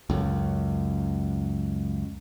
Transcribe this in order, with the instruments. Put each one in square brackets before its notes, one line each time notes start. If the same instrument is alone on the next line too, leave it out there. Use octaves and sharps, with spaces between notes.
[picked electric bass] C#2 F#2